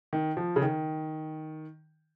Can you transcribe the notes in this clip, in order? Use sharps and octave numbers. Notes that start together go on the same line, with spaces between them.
D#3
F3
C#3
D#3